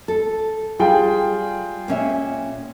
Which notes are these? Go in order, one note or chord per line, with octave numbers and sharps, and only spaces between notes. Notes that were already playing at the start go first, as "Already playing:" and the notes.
A4
G3 F4 G#4 G5
A#2 C#4 E5